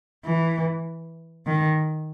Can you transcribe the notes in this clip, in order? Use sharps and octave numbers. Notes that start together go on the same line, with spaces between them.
E3
D#3